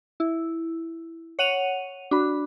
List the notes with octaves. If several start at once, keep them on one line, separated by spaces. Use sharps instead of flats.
E4
C#5 F#5 D#7 F7
D4 F#4 B5